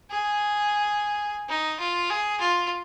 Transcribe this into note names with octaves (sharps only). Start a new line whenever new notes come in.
G#4
D#4
F4
G#4
F4